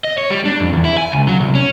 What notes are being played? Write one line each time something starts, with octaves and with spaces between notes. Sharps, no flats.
D#5
C#5
G3
D4
F2
E2
E4
G#5
C#2
F#3
C2
C#4